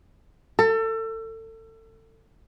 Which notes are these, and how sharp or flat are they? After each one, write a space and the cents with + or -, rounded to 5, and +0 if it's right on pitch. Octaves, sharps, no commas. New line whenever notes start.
A4 +30